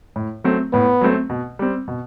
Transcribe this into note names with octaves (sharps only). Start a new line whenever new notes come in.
A2
F#3 A3 C4
A2 B3
F#3 A3 C4
B2
G3 C4
B2